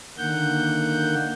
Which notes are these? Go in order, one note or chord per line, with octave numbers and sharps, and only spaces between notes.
D3 D#3 A#3 F#5 G6